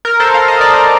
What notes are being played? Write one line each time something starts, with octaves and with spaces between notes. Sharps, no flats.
A#4
A4 C5
F5
D#5
D5
C5 D#5